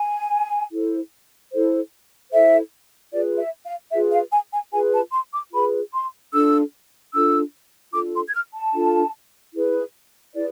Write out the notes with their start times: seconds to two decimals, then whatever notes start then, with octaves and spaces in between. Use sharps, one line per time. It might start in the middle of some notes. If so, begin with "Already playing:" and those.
Already playing: G#5
0.72 E4 A4 C5
1.52 E4 A4 C5
2.31 E4 A4 C5 E5
3.12 F4 G#4 B4 D5
3.39 E5
3.65 F5
3.92 F4 G#4 B4 E5
4.12 F5
4.32 G#5
4.53 G#5
4.72 F4 G#4 B4 G#5
4.93 A5
5.12 C6
5.33 D6
5.53 F4 G#4 B4 B5
5.93 C6
6.33 D4 F4 A4 E6
7.14 D4 F4 A4 E6
7.93 D4 F4 A4 D6
8.14 C6
8.29 G#6
8.34 F6
8.54 A5
8.74 D4 F4 A4
9.54 E4 G#4 B4
10.35 E4 G#4 B4 D5